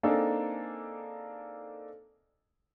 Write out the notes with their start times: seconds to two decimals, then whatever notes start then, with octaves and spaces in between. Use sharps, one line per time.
0.03 A#3 C4 D4 D#4 G#4 A4